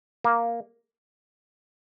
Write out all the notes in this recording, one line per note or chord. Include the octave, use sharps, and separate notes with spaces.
A#3